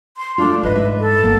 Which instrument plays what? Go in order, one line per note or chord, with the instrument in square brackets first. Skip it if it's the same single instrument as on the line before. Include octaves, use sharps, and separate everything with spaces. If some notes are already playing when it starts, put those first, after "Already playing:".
[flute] C6
[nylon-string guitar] A3 F4 [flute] D4
[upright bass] G#2 [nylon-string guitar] E4 D#5 [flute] B4
[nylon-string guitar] E5
[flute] A4
[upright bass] G1 [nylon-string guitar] A#3 B3